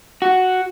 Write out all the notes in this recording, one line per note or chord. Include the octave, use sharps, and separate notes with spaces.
F#4